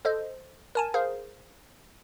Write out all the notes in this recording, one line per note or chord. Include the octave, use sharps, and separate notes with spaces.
A4 C5 D#5
A#4 G#5 A5
G#4 A#4 C5 F5